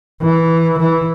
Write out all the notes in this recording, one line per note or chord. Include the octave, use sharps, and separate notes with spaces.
E3
E3